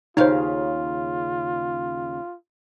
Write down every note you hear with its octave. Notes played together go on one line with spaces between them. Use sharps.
D#2 C#3 D#4 F4 C5 F5